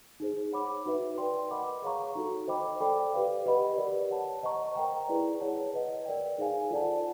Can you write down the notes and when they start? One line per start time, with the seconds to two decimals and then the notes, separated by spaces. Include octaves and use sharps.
0.20 D#4 G#4 C5
0.53 C#5 F#5 B5 D6
0.85 D#4 F#4 B4 E5
1.18 B4 D5 G5 C6
1.50 A#4 D#5 F#5 B5 D6
1.82 G#4 C#5 F5 A#5 C#6
2.15 D#4 F#4 A4
2.48 C5 D#5 G5 B5 D6
2.81 A4 D5 G5 B5 D6
3.13 G4 B4 D5 F5
3.46 G4 B4 D#5 F#5 B5
3.77 G4 A#4 D5
4.10 C#5 F#5 A5
4.43 C5 D#5 F#5 A#5 C#6
4.75 A#4 D#5 G5 A#5
5.08 E4 G#4 B4 D5
5.40 G#4 C#5 F#5 A5
5.74 B4 D#5 F#5
6.06 A#4 D5 G5
6.38 D#4 G#4 C5 F5 G#5
6.71 F4 A4 D5 F#5 A5